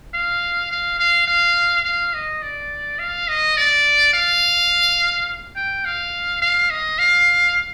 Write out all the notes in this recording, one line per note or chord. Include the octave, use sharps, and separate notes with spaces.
F5
F5
F5
F5
F5
D#5
D5
F5
D#5
D5
F5
G5
F5
F5
D#5
F5